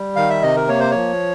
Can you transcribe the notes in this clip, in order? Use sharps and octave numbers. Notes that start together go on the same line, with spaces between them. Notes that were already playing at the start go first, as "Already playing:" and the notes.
Already playing: G3
D#3 F5
E5
C3 D#5
A#4
A#3 C#5
C5
F3 C#5